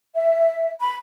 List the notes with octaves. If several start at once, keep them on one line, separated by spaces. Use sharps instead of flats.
E5
B5